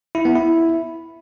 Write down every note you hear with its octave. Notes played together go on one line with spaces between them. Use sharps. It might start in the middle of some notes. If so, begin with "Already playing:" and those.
E4
B3
E4